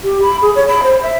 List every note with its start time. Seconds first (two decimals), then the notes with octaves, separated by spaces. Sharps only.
0.04 G4
0.22 B5
0.42 G#4
0.55 C#5
0.68 B5
0.83 C5
1.03 E5